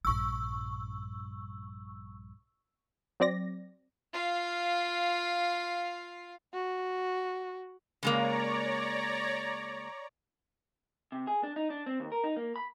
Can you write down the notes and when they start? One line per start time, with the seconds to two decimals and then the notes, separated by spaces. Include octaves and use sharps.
0.05 A#1 G2 C#6 E6
3.20 F#3 C4 D5 A#6
4.13 F4 F5
6.53 F#4
8.03 C#3 G#3 A#3 C#5 D5 A#5
11.12 C3
11.27 G#4
11.43 D4
11.56 D#4
11.70 D4
11.86 C4
12.00 D#2
12.12 A#4
12.24 D#4
12.37 A#3
12.56 B5